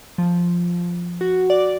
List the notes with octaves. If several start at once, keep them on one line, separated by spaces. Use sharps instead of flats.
F3
F#4
D5